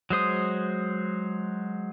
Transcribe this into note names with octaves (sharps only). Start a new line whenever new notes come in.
F#3 G#3 C5 D#6